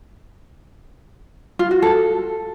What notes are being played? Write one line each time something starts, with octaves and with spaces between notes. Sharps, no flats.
F4
F#4
A4